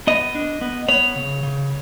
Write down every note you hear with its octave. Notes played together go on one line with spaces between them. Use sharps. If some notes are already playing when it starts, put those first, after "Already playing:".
B3 D#5
D4
B3
B3 C#5
C#3
C#3